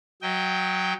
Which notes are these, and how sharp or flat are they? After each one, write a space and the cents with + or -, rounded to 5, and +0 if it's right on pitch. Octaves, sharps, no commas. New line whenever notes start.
F#3 +0 D#5 +30 G5 +0